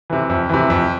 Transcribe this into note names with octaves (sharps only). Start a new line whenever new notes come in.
C3 E3
F2
C3 E3
F2